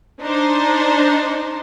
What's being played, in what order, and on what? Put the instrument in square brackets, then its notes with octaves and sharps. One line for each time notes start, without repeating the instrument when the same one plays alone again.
[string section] D4 D#4 C5